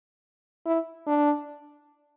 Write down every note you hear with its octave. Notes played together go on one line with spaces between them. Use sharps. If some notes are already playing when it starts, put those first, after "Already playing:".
E4
D4